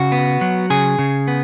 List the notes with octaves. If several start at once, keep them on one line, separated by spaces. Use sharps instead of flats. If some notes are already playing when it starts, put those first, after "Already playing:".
Already playing: C#3 F#4
B3
F#3
C#3 G#4
C#3
B3